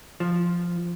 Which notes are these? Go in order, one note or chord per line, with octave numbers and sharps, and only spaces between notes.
F3